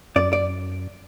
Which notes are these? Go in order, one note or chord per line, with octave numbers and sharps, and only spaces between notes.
F#2 D5
D5